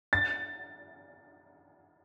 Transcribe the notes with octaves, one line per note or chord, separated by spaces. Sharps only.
A6